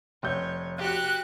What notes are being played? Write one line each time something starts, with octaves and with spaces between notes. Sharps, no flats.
F1 C#5 G6
F#4 G4 F#6